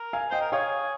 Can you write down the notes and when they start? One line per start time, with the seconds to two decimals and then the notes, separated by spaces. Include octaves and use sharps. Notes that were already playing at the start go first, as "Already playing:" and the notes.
Already playing: A#4
0.13 F5 G#5
0.31 C5 D#5 G5
0.41 A#4
0.52 G#4 C#5 F5